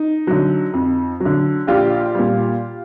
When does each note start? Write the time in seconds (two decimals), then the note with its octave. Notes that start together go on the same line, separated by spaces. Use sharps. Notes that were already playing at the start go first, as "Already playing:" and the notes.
Already playing: D#4
0.27 D3 F#3
0.73 F2
1.20 F#3
1.25 D3
1.67 A#1 F4 G4
2.15 A#2 G3